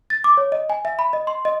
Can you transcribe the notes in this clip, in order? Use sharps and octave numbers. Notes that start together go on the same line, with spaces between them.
A6
D6
C#5
D#5
G#5
E5
B5
D#5
C6
D#5